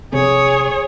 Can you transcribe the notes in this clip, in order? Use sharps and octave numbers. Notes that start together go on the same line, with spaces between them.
A#1 C3 C4 G#4 C#5